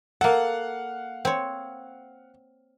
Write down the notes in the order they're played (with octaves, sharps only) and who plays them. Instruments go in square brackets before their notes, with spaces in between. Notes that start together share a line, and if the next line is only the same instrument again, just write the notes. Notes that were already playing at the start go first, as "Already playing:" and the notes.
[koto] A#3 A4 [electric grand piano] F5 F#5
[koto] C4 C#5